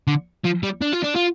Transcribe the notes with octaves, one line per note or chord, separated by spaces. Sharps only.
D3
F3
G3
D4
F4
D4
F4